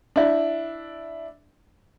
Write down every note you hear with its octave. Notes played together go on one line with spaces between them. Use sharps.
D4 E4